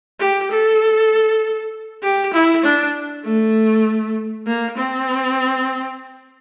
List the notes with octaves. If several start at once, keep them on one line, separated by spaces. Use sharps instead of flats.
G4
A4
G4
E4
D4
A3
A#3
C4